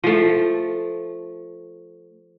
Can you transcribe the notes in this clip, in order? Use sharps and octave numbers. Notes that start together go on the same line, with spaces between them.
F3 A3